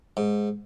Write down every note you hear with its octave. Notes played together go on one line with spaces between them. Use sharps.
G#2